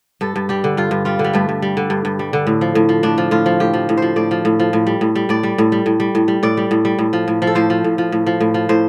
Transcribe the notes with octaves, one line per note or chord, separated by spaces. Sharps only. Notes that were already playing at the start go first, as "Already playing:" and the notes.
G2 A4
G2
G3 G4
D3
G2 F4
G2
G3 F4
D3
G3
G2 A3
G2
G3
D3
G2
G2
G3
D3
A2
F3
A2
F3
A2 D4
F3
A2 F4
F3
A2 G4
F3
A2
F3 C5
A2 D5
F3
A2
F3
A2
G3
A2
G3
A2 D5
G3
A2
G3
A2
G3
A2
G3
A2 D5
G3
A2
G3
A2
F3
A2
F3
A4
A2 C5
F3
A2
F3
A2
F3
A2
F3
A2 C5